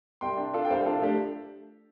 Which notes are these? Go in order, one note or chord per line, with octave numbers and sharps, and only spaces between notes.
C2 G5 C6
D4
D4 F4 A4
G5
C2 C5 F5
C5
D4 F4 A4
A3 D4 G4